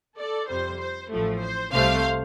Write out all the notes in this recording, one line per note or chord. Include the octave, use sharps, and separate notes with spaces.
A4 D5
F2 C3 G3 C5
C5
A1 A2 F3 A3
C5
C2 C3 A3 C5 F5